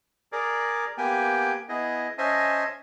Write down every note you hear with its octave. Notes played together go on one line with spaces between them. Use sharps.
G#4 A#4 D5
A#3 B3 G4 G5 G#5
B3 E4 G#4 D#5
C#4 C5 D#5 E5 G#5 A5